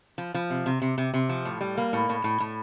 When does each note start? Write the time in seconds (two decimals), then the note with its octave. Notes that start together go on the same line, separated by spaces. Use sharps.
0.18 F3
0.34 F3
0.50 C3
0.66 C3
0.82 C3
0.98 C3
1.14 C3
1.29 F3
1.45 A2
1.61 G3
1.78 A#3
1.93 A2
2.09 A2
2.24 A2
2.40 A2